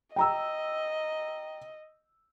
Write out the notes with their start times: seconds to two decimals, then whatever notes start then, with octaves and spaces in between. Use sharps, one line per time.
0.16 D#5 G5 A#5 E6